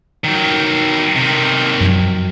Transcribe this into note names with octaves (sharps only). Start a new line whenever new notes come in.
D#3 F#3
C3 D#3
F#2 F3 F#3